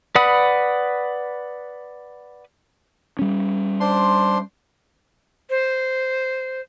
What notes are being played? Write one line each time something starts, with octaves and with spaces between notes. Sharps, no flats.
B4 D5 F#5 B5 D#6
G3 C#4
D4 C5 C6
C5